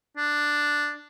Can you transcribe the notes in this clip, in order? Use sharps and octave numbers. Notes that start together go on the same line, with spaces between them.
D4